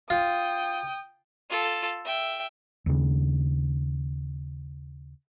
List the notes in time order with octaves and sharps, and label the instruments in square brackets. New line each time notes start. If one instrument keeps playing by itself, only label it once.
[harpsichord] F4 [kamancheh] G5 D#6
[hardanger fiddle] F4 A4
E5 G5
[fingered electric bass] D#2 C#3